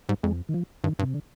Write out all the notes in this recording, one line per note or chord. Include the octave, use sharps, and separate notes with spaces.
G#2 G3
F2 G#3
D#3
F3
G2 D#3
G2
C3
D3